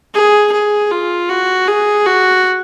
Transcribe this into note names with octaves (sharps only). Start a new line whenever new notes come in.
G#4
G#4
F4
F#4
G#4
F#4